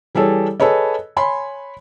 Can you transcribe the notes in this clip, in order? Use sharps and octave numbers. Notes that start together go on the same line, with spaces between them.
E3 G3 G#4 A4 C#5
G#4 A4 B4 C#5 D#5
C#5 G#5 B5 C6